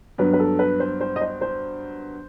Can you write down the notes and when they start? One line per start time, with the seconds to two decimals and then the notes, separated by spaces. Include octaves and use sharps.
0.18 G2 F#3 B3 B4
0.33 B4
0.40 A4
0.59 B4
0.80 C5
1.00 C5
1.16 D#5
1.21 C5
1.41 C5